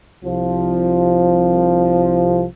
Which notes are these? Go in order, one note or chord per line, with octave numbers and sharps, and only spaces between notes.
C2 F3